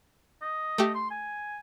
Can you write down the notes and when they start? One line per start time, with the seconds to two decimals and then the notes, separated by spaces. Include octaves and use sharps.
0.42 D#5
0.78 A3 G4
0.95 C6
1.11 G#5